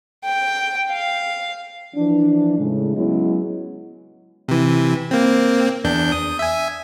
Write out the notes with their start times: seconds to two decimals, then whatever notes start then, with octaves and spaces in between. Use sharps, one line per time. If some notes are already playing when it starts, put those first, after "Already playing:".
0.24 G5
0.91 F5
1.95 E3 F3 D4
2.57 A2 C#3 G#3
2.96 F#3 G#3 B3 C#4 E4
4.48 C3 E3
5.11 A#3 C4
5.84 E2 D4 G6
6.12 D#6
6.39 E5 G#5